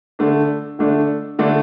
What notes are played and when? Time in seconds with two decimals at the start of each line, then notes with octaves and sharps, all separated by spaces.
0.19 D3 A3 D4
0.79 D3 A3 D4
1.39 D3 A3 D4